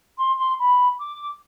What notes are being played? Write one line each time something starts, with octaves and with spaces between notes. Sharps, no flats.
C6
C6
B5
D6